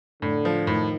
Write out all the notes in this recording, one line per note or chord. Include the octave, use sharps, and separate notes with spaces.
A2 D3
F3
A2 D#3